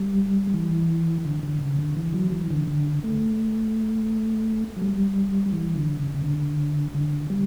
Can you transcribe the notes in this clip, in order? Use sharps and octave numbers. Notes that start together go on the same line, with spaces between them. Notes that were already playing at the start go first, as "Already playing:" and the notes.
Already playing: G3
E3
D3
D3
C#3
D3
E3
F#3
E3
D3
D3
A3
F#3
G3
E3
D3
C#3
C#3
D3
D3
G3